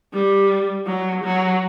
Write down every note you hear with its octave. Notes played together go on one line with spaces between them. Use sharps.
G3
F#3
F#3